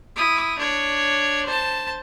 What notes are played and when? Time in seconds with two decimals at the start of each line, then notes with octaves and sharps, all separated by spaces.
0.16 E4 D#6
0.58 D4 C#5
1.46 C5 A5